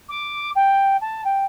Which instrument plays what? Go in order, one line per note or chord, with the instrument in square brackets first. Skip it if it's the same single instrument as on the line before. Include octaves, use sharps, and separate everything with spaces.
[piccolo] D6
G5
A5
G5